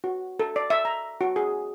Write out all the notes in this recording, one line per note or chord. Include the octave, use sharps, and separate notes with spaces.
F#4
A4
D5
E5
A#5
F#4
G#4